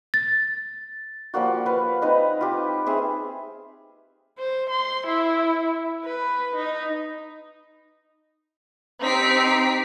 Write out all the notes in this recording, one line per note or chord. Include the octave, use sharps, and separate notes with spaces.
A6
F3 G3 A#3 F#4
B4 F5
C4 D#4 B4 D#5
F4 G4
C4 G#4 E5
C5
C6
E4
B4
D#4
C4 D#4 G4 B6 C7 D7